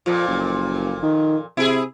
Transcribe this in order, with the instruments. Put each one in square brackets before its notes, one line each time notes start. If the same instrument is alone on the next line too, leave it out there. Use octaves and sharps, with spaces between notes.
[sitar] F2 A#2 [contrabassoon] F3
[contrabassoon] F#1
D#3
[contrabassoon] C3 [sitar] E4 G#4